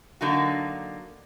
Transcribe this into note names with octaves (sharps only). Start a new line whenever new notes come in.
D3 F#3 A#3 D#4 F#4